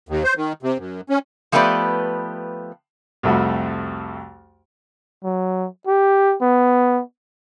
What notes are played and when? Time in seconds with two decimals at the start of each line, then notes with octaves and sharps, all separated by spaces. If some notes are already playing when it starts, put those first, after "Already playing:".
0.09 D#2
0.24 C5
0.37 D#3
0.63 C3
0.78 F#2
1.09 C#4
1.52 F3 A3 B3 G4 B4 D5
3.23 C2 F2 A3 F#4 B5
5.24 F#3
5.87 G4
6.42 B3